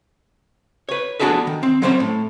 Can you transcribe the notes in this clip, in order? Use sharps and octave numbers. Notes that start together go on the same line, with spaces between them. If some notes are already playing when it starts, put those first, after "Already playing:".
B4 C#5
B3 D4 F#4 G#4 A4 B4
D#3
C4
F#3 G3 C4 C#4 A4 C5
A2